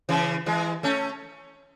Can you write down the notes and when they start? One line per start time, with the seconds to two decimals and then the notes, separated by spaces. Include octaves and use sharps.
0.09 C#3 E3
0.46 E3 G#3
0.83 A3 C#4